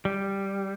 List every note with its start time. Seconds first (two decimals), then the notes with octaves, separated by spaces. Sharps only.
0.05 G3